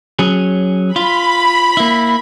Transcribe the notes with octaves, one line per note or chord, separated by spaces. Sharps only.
F#3 C#4 G#4
F4 B5
A#3 E4